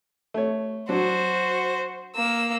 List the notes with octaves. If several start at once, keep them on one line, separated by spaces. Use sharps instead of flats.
A3 C#5
F#3 D4 F#4 C5
A#3 E6